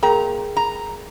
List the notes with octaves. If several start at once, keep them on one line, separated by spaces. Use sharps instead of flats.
A#2 G#4 A#4 G5 A#5
A#5